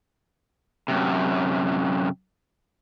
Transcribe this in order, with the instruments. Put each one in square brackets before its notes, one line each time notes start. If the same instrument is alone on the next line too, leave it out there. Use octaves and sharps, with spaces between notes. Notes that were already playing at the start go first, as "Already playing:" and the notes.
[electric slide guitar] F#2 C3